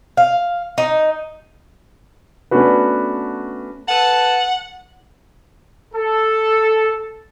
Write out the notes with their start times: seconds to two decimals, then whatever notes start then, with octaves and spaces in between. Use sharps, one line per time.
0.17 F5
0.78 D#4
2.51 A3 B3 C#4 D4 F#4 B4
3.88 A4 B4 F#5 A5
5.94 A4